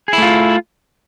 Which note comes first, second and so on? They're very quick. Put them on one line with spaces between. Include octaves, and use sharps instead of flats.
G#4 E4 A3 F4